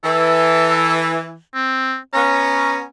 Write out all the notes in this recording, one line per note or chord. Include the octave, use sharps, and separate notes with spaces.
E3 A4
C4
B3 C#4 A#5